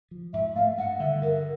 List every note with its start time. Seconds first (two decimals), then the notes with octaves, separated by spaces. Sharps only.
0.11 F3
0.33 G#2 E5
0.55 A3 F5
0.78 G2 F#5
1.00 D3 E5
1.21 G2 A#4